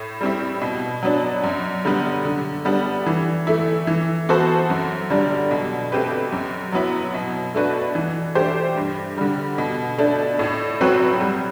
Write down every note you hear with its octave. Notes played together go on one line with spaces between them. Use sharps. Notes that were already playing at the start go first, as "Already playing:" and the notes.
Already playing: A2
G3 C4 E4
B2
F#3 B3 D4
F#2
D3 G3 B3
D3
G3 B3 D4
E3
A3 E4
E3
B3 F#4 A4 C5
F#2
D3 G3 D4
B2
A3 C4 G4 B4
F#2
F#3 B3 E4
B2
A3 D4 F#4 B4
E3
A3 D4 G4 C5
G2
D3 G3
B2
A3 D4
A2
F#3 C4 F#4 B4
G3